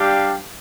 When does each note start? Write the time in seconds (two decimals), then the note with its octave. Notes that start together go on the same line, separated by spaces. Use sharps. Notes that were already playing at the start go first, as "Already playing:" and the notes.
Already playing: G3 D4 G4 F5